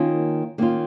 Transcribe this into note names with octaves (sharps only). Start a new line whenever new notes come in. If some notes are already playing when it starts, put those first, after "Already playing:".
Already playing: D#3 A#3 C#4 F4
D#3 A#3 C#4 F4